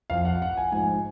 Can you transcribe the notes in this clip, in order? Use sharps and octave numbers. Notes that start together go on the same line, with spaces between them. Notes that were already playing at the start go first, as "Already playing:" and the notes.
F2 F3 F5
F#5
F#5
G#5
G#2 F3 G#5